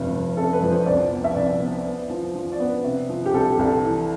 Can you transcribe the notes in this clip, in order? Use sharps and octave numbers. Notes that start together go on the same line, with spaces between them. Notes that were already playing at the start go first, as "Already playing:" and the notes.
Already playing: F1 G2
F1
C3 A4
B4
F2
C5
C2 D5
B3
E5
C2 D5
B3
B3
F3
F3
D5
B3
B4
C3
F3
G4
C2 A4
G4
C2
A4
E3